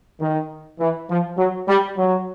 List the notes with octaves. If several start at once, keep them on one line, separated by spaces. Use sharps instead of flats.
D#3
E3
F3
F#3
G3
F#3